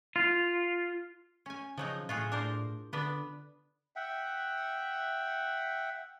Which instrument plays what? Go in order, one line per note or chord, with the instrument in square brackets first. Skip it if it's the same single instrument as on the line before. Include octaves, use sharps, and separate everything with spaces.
[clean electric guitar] F4
[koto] C#4 G#5
[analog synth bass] C#3 [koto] F3 F#3 D#4
[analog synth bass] A2 [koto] F4 F#4 G#4
[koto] D4 A#4 C5
[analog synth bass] D3 [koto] B3 D4 B4
[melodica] E5 F#5 G5